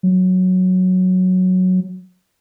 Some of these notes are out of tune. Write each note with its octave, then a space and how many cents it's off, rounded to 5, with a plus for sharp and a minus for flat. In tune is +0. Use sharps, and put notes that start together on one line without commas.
F#3 -5